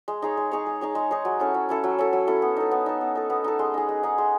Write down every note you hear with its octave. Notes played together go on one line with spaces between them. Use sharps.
G#3
D#4 G#4 C#5
G#3
D#4 G#4 C#5
G#3
D#4 G#4 C#5
G#3
D#4 G#4 C#5
F#3
C#4 E4 A4
F#3
C#4 E4 A4
F#3
C#4 E4 A4
F#3
C#4 E4 A4
B3
D#4 A4
B3
D#4 A4
B3
D#4 A4
B3
D#4 A4
G#3
D#4 G#4
G#3
D#4 G#4
G#3